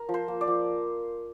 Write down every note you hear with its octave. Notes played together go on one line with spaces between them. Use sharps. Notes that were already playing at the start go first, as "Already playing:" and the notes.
Already playing: A#4
F3
C5
A#3
D5
F3